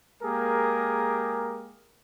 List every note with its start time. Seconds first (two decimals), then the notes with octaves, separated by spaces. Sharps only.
0.23 G#3 A#3 G4 G#4 A#4